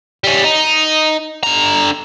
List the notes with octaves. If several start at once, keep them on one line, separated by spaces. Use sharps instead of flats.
G3 C#4
D#4
D3 A#5